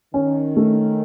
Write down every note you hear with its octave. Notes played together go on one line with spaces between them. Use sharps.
D#3 C#4
A3